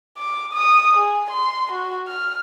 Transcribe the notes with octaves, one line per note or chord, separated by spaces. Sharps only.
D6
D#6
G#4
C6
F#4
F6